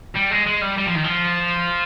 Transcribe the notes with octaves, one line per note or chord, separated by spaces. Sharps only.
G3
G#3
G#3
G3
G3
F3
D#3
F3